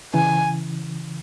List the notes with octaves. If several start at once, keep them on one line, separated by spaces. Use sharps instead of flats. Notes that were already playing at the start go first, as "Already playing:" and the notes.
C#3 E3 G#5